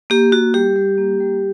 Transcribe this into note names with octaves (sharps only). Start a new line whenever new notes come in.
A#3 G4
A#3 F#4
G3 G4
G3
A#3
G3